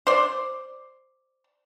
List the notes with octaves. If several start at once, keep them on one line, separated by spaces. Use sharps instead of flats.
C5 D5